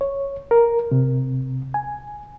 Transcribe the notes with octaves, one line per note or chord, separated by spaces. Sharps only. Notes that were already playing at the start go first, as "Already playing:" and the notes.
C#5
A#4
C3
G#5